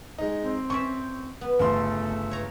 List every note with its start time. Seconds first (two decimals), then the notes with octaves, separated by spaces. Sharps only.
0.18 G#3 D#4
0.42 C4
0.70 C#4 D5 E5 C#6
1.41 B3
1.59 G1 C#3 A3 C6
2.31 C#5 A#5